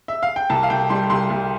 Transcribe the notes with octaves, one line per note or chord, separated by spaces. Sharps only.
E5
F5
G5
C2 A5
F5
C2 G5
G3 C6
C2 C6
C2